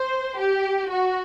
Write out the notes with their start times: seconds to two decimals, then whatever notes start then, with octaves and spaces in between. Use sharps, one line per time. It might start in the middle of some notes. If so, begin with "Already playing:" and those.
Already playing: C5
0.38 G4
0.89 F#4